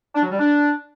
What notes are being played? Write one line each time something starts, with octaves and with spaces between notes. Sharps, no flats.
D4
F#3
G3
D4